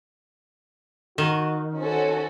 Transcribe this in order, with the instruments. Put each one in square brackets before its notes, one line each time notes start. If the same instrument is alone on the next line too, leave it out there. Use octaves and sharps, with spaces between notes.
[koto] D#3 [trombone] F#4
[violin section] C#4 F#4 A4 [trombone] C5